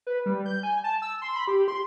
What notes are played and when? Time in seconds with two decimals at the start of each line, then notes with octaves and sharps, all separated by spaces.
0.07 B4
0.26 G3
0.46 G6
0.63 G#5
0.84 A5
1.02 E6
1.22 C6
1.36 B5
1.47 G4
1.68 C6